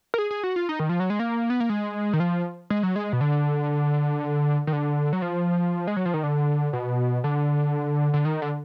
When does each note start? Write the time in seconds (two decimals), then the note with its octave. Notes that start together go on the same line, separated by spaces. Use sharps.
0.14 A#4
0.18 G#4
0.31 G#4
0.43 F#4
0.56 F4
0.69 D#4
0.79 D#3
0.89 F3
1.00 F#3
1.10 G#3
1.19 A#3
1.50 B3
1.60 A#3
1.69 G#3
2.13 D#3
2.20 F3
2.70 G#3
2.83 F#3
2.96 G#3
3.13 B2
3.21 D3
4.67 D#3
4.73 D3
5.13 F#3
5.22 F3
5.87 G#3
5.96 F#3
6.05 F3
6.14 D#3
6.23 D3
6.73 B2
7.24 D3
8.14 D3
8.25 D#3
8.42 D3